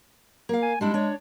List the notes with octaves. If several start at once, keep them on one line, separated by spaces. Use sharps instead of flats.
A#3 F5
G#5
G3 G#3 D4 E4
D4 C#5